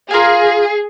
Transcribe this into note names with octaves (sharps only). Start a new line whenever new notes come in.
F4 G#4 A#4 F5 G#5